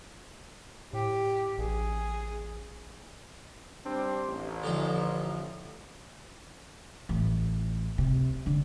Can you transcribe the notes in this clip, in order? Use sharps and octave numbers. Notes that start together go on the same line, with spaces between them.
A2 G4
A1 G#4
G3 C4 D4
A1
D3 F3 D#4
A1
C3
D3